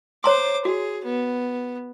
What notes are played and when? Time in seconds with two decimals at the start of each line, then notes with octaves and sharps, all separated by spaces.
0.24 C5 C#5 A#5 C6 D6
0.65 F#4 G#4
1.05 B3